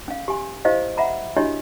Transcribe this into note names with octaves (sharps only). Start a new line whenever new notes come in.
C#4 F5
G4 G#5 C6
E4 G4 C5 D#5 F5
E5 F#5 A#5 B5
D4 E4 F#4 G4 C#5 D#5